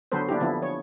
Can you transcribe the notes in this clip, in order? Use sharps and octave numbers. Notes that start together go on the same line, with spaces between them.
D3 F#3 B3 A4 B4 C5
A#3 D4 E4 G4
D3 F3 B3 E4
C#5